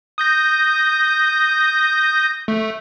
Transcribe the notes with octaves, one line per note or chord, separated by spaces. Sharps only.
D#6 G6 A#6
A3